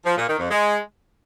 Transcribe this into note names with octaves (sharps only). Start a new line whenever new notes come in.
F3
A#2
D#3
F2
G#3